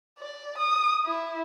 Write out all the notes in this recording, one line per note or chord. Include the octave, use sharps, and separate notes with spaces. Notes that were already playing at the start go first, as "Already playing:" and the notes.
D5
D#6
E4